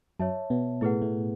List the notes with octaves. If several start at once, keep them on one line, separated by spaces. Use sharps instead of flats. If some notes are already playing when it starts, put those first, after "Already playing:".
F#2 F#3 C#5 E5 A5
B2 B3
A2 A3 E4 G#4 B4 F#5
A2 A3